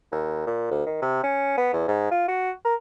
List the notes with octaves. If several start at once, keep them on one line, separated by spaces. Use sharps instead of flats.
D#2
A#2
D2
D#3
C3
C#4
B3
E2
G#2
F4
F#4
A#4